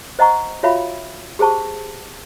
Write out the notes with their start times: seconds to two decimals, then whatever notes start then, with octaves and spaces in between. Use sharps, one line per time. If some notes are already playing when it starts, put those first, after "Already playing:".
0.19 C5 D#5 F#5 A#5 C#6
0.63 F4 F#4 C#5 E5 F5 B5
1.39 G4 G#4 C5 A5 C#6